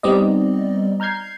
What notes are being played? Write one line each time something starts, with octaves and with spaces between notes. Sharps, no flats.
G3 B3 C4 D#4 D5 D#5
A#5 F6 G6 G#6 C7